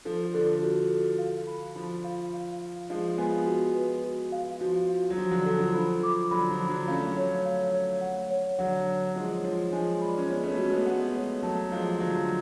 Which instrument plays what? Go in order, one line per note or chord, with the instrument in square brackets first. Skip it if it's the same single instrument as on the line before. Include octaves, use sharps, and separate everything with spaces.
[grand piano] F3 [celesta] A4
[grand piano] D3 [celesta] A4
[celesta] F#4
A4
F5
B5
[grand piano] F3 [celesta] B5
[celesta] F5
F5
F5
[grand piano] F3 G#3 [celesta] F5
[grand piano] G#3 B3 [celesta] G#5
[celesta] F#4
B4
F#4
F5
[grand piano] F3 [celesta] F#4
[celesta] F5
[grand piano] F#3
[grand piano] F3 [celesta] F#4
[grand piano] D3 F#3
[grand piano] F3 [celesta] A4
[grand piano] F3
[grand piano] F3 [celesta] B5
[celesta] D6
[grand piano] D3 F#3 [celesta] B5
[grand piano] F3
[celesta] B5
[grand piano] D3 F#3
[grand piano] A3 C#4 [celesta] F5
[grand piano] F#3 A3
[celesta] C#5
F5
C#5
F#5
C#5
[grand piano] D3 F#3 [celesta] F#5
[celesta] F#5
[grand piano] F3 G#3 [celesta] C#5
[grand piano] F3 [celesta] C#5
[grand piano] F3 G#3 [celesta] G#5
[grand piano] D4 [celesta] B5
[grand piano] C#4
[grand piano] G#3 B3 [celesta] C#5
[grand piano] A3 C#4
[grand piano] A3 C#4 [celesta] F#4
[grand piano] A3
G#3 B3
[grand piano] G#3 B3 [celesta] F#5
[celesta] C#5
[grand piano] F#3 A3 [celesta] A5
[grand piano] F3 G#3 [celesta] F5
[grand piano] D3 F#3 [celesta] F5